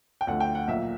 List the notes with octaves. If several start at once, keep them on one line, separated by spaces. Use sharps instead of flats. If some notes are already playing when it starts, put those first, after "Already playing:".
G5
D2 D3 F3 A3 F#5
G5
F#5
B1 A#2 F3 A#3 E5